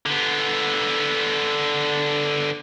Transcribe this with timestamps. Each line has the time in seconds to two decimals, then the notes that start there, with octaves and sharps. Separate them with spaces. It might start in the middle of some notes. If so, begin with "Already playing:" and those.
0.06 D3 B3